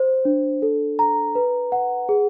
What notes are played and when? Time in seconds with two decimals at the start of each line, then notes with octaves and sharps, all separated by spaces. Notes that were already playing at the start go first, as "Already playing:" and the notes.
Already playing: C5
0.25 D4
0.62 A4
0.99 A#5
1.35 B4
1.72 F#5
2.09 G#4